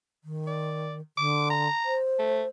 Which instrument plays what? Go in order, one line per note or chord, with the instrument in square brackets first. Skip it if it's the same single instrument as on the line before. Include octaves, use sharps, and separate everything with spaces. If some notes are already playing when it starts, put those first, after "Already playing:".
[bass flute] D#3
[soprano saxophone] D5
[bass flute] D3 [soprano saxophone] D6
[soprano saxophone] A#5
[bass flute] C5
[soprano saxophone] A3